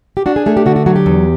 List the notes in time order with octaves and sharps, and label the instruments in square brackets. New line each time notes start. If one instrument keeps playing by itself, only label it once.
[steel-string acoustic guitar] G4
D4 F#4
G#4
A3 G#4
G4
D3 F#4
F#4
F#3 F#4
G4
E2